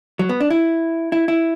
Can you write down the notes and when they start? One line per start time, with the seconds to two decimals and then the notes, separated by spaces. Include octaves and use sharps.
0.19 F#3
0.29 B3
0.40 D4
0.50 E4
1.12 E4
1.28 E4